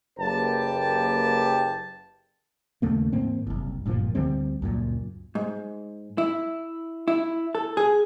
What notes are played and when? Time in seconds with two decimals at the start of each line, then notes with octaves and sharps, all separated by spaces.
0.18 F#1 A#3 G4 B4 G5 A5
2.82 D#2 C#3 A3 A#3
3.13 G#2 E3 A#3 C4
3.47 F#1 C2
3.85 D1 G2 A#2 F3
4.15 D2 D3 G3 C4
4.62 C#2 F#2 A#2
5.35 G#2
6.18 E4
7.08 E4
7.55 A4
7.77 G#4